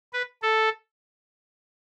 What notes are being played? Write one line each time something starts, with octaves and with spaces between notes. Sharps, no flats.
B4
A4